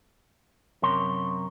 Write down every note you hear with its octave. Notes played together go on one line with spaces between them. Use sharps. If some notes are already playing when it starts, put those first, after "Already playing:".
F#2 C3 A#4 C#5 C6